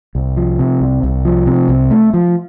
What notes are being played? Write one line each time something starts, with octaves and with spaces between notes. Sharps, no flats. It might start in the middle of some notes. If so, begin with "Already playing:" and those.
C2
F3
C3
C2
C2
F3
C3
C2
A3
F3